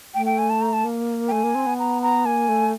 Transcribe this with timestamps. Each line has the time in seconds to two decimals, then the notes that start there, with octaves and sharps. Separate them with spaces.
0.14 A3 G5
0.26 G5
0.38 G#5
0.50 A5
0.62 A#5
0.73 A5
0.84 A#3
1.28 G5
1.32 A3 G#5
1.44 A#3
1.55 C4
1.67 B3
1.79 A#5
2.02 A#5
2.25 A#3 G#5
2.49 A3